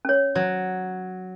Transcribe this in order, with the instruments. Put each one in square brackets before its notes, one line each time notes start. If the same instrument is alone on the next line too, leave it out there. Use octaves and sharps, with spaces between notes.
[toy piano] C#4 C#5
[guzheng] F#3